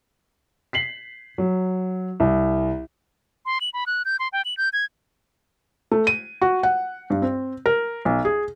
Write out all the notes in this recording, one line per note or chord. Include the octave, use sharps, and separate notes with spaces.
B6 C7 F#7
F#3
C2
C6
F#7
B5
F#6
G6
C6
G5
F#7
G6
G#6
A3
D#7
F#4
F#5
G2
C4
A#4
B1
G#4